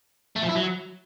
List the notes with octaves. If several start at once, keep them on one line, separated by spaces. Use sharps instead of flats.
A3
F3
E4
F#3